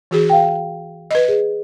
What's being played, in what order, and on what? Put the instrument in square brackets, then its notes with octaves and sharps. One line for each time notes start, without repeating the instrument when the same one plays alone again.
[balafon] E3 F#4 G#4
[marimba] F5 G5
[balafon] B4 D#5
[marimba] G#4